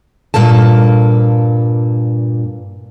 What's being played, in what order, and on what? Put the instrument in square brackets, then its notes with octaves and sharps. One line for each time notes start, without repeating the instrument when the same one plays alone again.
[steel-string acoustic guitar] G2 A#2 A#3 A4 A5